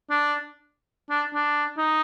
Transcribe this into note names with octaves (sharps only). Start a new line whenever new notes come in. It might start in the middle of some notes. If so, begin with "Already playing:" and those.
D4
D4
D4
D#4